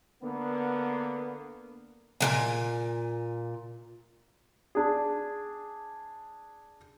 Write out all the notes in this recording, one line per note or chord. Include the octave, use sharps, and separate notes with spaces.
D3 A#3 B3
A#2 G#3 G#5
D4 G#4